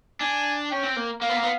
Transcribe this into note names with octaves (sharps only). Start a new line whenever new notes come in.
D4 G#5
C#4 G5
C4
A#3
A#3 F5
B3
A#3
B3